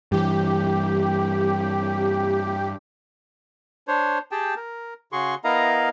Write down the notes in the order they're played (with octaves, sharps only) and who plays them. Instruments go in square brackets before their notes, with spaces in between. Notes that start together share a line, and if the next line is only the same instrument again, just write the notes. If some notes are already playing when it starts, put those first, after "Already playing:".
[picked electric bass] G2 E3 [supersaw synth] G4
[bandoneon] D4 C5 C#5
G4 G#4 G5 A5
A#4
C#3 F#4 G#4 C6 C#6
B3 E4 A#4 D#5 F5 A#5